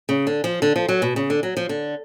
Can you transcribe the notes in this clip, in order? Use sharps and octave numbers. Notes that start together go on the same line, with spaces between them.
C#3
D3
F3
D3
F3
F#3
B2
C#3
D3
F#3
F3
D3